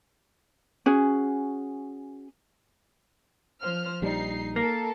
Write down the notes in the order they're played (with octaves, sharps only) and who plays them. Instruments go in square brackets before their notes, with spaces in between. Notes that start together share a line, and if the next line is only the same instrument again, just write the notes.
[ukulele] C#4 F#4 G#4
[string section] F3 C5 F6
[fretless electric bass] A#1 G3 [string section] D#4 C7
[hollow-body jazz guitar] A#3 [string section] A4 A#4